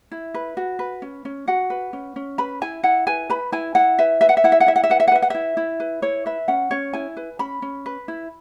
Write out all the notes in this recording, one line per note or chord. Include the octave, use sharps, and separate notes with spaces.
E4
B4
F#4
B4
C#4
C#4
F#4 F#5
B4
C#4
C#4
B4 B5
E4 G#5
E4 F#5
B4 G#5
B4 B5
E4 G#5
E4 F#5
B4 E5
B4 E5
F#5
E5
E4 F#5
E5
F#5
E4 E5
F#5
E5
B4 F#5
E5
F#5
B4 E5
F#5
E4 E5
E4
B4
E4 C#5
B4 E5
C#4 F#5
C#4 C#5
E4 G#5
B4
C#4 B5
C#4
B4
E4